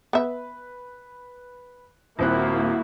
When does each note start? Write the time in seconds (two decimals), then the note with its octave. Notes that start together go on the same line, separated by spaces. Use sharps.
0.13 B3 B4 E5
2.19 D#1 A#3 C4 E4 F#4 F#6